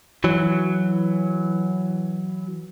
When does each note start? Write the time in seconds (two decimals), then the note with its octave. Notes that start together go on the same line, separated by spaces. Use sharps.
0.24 E3 F#3